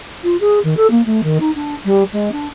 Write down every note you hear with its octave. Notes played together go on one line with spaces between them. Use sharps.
F4
G#4
D#3
A4
A#3
A3
D#3
D#4
D4
G3
G#3
D4